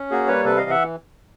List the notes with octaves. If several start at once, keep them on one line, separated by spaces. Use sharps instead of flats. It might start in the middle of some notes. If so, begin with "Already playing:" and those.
Already playing: C#4
A#3 F#4 G#4
G3 B4 C#5
C3 A4 B4
E3 D#5 F5
E5 F#5